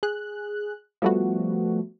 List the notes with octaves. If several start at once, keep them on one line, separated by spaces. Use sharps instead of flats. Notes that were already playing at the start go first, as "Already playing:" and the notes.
G#4 F#6
F3 G3 A3 B3 F#4